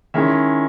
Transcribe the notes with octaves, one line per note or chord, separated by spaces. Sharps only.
D#3 G#3 C#4 E4 E5